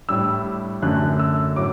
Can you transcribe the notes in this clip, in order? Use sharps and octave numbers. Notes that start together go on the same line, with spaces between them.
A2 G3 D4 E6
F#2 D3 A3 C#4 F#6
E6
A2 F#3 D6